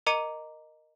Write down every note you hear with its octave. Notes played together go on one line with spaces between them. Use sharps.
A#4 D#5 A#5 D6 C#7 D#7